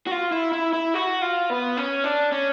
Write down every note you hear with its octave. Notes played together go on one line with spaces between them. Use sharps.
F#4
F4
E4
E4
E4
F#4
F4
B3
C#4
D4
C#4